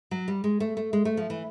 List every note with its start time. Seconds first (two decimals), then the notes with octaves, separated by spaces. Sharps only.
0.11 F#3
0.28 G3
0.44 G#3
0.60 A3
0.77 A3
0.93 G#3
1.05 A3
1.17 F3
1.30 E3